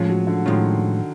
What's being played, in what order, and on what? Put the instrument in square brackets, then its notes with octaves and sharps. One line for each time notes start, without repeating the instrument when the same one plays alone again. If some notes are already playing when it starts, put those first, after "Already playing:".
Already playing: [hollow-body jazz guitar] A2 F3 G#3 C#4 F4
[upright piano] F#3
D3
[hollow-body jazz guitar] A2 F3 G#3 C#4 F4 [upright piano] D#3